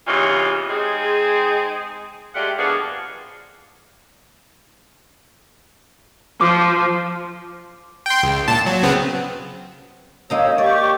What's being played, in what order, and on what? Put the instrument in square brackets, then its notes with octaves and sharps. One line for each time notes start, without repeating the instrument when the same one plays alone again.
[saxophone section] E2 C3 E3 C#4 D#4 F4
G#3 C4 D#4 G#4
G#3 A3 F4 G4 D5 F#5
B2 F3 A#3 B3 D4 G#4
[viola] F3 [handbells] D6
[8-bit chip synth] G5 C6
C#2
A#2 A5
F#3
C#3 B3 C4
[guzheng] A#3 D#4 A#5 [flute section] G4 C#5 E6
[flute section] G4 C#6 D6 [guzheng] D5